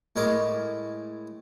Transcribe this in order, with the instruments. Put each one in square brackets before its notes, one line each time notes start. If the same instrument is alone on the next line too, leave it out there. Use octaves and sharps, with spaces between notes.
[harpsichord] A2 G#3 A#4 C#5 A#5 D6